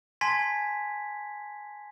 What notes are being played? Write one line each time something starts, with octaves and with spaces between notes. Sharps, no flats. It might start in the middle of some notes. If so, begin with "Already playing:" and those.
G#5 A5 C6 G#6 A6 B6